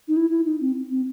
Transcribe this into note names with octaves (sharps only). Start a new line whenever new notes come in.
D#4
E4
E4
D#4
C4
C4